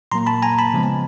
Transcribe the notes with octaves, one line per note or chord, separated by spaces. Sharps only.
A#2 F#3 A#3 A#5 C6
A5 B5
G#5 A#5
A5 B5
C#3 F3 G#3 B3